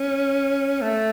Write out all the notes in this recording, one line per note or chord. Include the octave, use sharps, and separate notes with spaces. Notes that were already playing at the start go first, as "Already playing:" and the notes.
Already playing: C#4
A3